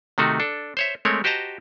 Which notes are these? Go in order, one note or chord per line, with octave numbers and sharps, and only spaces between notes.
C3 D#3 A3 D#4 F#4
D4 A4
C5 C#5 E5
G#3 A3 C4 A#4 C#5
F#4 G4 C5 D#5 A5 A#5